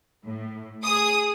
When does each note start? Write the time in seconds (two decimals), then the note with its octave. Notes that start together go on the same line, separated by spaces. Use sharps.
0.24 A2
0.83 G#4 D#6